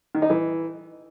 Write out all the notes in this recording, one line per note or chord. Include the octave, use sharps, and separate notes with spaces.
D#3
D#4
E3